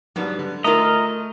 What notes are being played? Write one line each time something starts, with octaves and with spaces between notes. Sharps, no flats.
G#2 F#3 G3 B3 D4
D3
A3 F4 A#4 D#5 E5 A#5